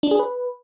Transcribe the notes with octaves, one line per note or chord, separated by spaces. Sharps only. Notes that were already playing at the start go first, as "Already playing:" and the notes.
D4
G#4
B4